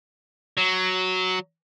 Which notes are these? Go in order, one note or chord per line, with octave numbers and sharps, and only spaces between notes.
F#3